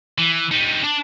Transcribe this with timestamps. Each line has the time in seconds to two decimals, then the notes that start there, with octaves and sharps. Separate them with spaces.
0.18 E3
0.51 G3 D#4
0.84 D4